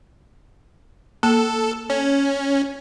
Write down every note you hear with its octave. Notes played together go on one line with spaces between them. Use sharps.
A#3 A4
C#4